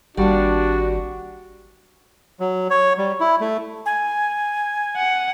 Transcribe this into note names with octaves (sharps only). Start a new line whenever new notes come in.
G#1 G3 A#3 D4 F#4
F#3
C#5
G3
E4
A3
G#5
F#5